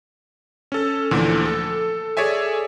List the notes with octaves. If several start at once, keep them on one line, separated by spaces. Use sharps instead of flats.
C#4 A4
D2 A#2 D3 E3 F3
A4
G#4 A4 C#5 D5 E5 G#5